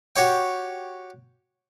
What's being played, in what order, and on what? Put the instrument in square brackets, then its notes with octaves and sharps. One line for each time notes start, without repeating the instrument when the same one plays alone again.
[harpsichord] F#4 G4 C#5 G5